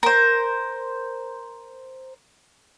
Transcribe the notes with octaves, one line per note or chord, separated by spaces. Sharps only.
A#4 C5